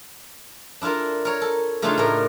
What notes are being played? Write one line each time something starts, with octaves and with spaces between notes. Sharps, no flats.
D4 E4 F4 A4 A#4
A#4 C#5
A4
C#3 A3 D4 D#4 F4 G#4
A2 A#4